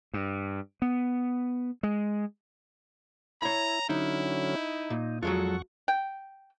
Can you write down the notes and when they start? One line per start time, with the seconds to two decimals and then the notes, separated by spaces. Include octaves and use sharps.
0.14 G2
0.82 B3
1.83 G#3
3.42 E4 C#5 A#5 B5
3.89 D3 F#3 C#4 D#4 E4
4.56 D#4
4.90 A#2
5.23 F2 F#3 G#3 F4 A4 F#5 C#6
5.88 G5